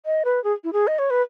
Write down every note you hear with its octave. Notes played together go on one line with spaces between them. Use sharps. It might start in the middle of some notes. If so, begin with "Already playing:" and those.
D#5
B4
G#4
E4
G#4
D#5
C#5
B4